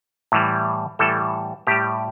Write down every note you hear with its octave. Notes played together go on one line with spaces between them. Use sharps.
A2 E3 G3
A2 E3 G3 A4
A2 G3 G4